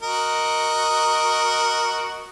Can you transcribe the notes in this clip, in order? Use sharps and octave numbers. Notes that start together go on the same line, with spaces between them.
F#4 A#4 D#5